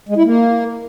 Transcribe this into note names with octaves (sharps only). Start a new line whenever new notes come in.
G#3
E4
A#3